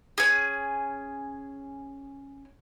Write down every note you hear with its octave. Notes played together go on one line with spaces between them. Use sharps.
C#4 G#4